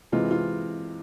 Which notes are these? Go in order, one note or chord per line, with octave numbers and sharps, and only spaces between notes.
C3 E3 G#3 F4
F4